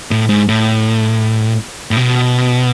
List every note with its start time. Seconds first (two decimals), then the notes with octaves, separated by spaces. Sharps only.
0.11 A2
0.29 G#2
0.48 A2
1.91 A2
1.97 B2